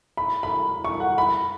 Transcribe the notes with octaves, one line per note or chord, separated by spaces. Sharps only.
B5
B5
C#6
F#5
B5